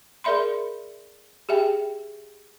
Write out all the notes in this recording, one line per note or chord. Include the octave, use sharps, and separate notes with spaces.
G#4 A#4 D5 E5 B5 C6
G4 G#4 E5 G5 G#5